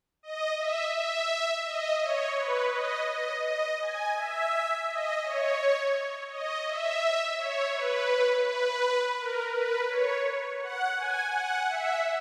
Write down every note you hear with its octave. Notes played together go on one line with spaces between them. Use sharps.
D#5
E5
E5
D#5
C#5
B4
D#5
D#5
D#5
G#5
E5
D#5
C#5
D#5
E5
C#5
B4
B4
A#4
B4
C#5
F#5
G#5
F#5
E5